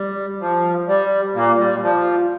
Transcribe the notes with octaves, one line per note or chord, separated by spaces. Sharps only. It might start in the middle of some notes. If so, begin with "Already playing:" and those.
Already playing: G3
F3
G3
A#2 A#3
G3
F3